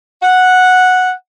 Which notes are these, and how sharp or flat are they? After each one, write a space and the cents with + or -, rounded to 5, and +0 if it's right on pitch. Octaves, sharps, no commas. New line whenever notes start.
F#5 -5